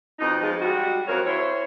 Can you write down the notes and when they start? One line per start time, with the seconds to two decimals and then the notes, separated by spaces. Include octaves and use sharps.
0.19 F2 B2 D#4
0.42 F3 G#3
0.61 G3 G#3 F#4
1.07 F2 F3 F#3 A#4 C#5
1.25 E4 C5 C#5